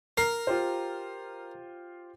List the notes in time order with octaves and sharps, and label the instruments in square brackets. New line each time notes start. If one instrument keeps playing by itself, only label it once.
[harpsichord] A#4 [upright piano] C7
[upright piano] F4 G4 C5